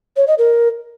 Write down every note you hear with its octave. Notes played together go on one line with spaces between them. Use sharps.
C#5
D#5
A#4